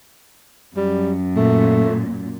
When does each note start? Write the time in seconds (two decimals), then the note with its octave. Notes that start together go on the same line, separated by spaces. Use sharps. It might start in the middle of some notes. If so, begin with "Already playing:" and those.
0.77 F#2 G3
1.36 A#2 A3